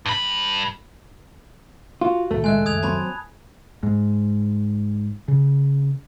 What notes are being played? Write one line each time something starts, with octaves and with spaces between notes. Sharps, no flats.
G2 B5
F4 F#4
C#2 A#2 D#3 A3
G#3 D#5 E5 G#5 F#6
C#2 F#2 D#3 D#6 G#6 F7
F#3 C4 A5 B5
G#2
C#3